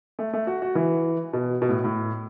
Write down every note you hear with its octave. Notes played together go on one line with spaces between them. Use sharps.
A3
A3
F#4
F#4
E3
B2
B2
A2
A2